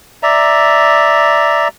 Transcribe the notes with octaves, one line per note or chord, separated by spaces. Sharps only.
D5 E5 A#5